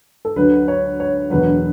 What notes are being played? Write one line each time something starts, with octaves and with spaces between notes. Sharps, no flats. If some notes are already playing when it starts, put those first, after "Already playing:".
A4
D2 D3 F#3 B4
C#5
C#5
E1 E2 D3 F#3 B4